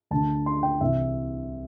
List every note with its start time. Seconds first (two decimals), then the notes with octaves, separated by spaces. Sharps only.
0.11 D2 D3 A5
0.46 C6
0.63 G5
0.81 C2 C3 E3 E5